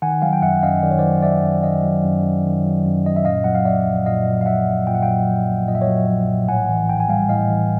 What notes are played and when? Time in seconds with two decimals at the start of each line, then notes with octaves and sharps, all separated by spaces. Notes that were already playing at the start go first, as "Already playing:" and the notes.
0.02 D#3 F#5 G#5
0.22 F#3 F5 G5
0.33 G5
0.42 F#2 E5 F#5
0.63 F#2 D#5 F5
0.82 D#3 D5
0.91 C#5
0.99 F#3 C5 D5
1.23 F#2 D5 E5
1.43 F#2
1.63 D#3 D#5 F5
1.83 F#3
2.05 F#2
2.24 F#2
2.45 D#3
2.64 F#3
2.85 F#2
3.06 F#2 D#5
3.16 E5
3.25 A#2 D#5 F5
3.44 F#3 F#5
3.55 F5
3.65 A#1 D5 E5
3.86 A#1
4.06 A#2 D#5 F5
4.27 F#3
4.41 F5
4.46 A#1 E5 F#5
4.67 A#1
4.87 A#2 G5
4.95 F#5
5.02 F#3 F5 G5
5.27 A#1
5.47 A#1
5.68 A#2 D#5
5.75 E5
5.82 C#5 D#5
5.87 F#3
6.08 A#1
6.29 A#1
6.48 A2 F#5 G#5
6.69 E3
6.89 A#1 G5
7.00 G#5
7.09 G3 F5 G5
7.29 A2 D#5 F5
7.50 E3